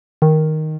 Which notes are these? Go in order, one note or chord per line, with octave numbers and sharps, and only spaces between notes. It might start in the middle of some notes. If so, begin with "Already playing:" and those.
D#3